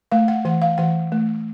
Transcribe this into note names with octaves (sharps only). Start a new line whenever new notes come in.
A3 F5
F#5
E3 F#5
F5
E3 F#5
A3